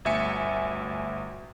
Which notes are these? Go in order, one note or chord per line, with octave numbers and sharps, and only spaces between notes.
G1 D2 E5 G#5 C#7